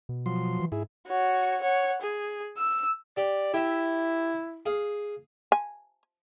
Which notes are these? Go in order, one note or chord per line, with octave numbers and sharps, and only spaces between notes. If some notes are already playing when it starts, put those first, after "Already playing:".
B2
F3 F#3 C6
E3
G#2 E4 G#4
F#4 C#5
C#5 F#5
G#4
E6
G4 D5
E4 G4 E5
G#4 F5
G#5